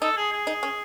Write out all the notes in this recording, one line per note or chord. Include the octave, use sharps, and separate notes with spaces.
D#4 A4
G#4
G#4
D#4
C#4